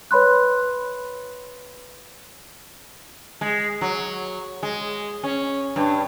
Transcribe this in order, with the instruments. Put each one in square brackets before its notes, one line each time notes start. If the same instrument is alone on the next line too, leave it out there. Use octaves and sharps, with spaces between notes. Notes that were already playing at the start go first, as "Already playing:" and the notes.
[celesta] B4 C#5 B5 C6 F#6
[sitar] G#3
F#3
G#3
C#4
G2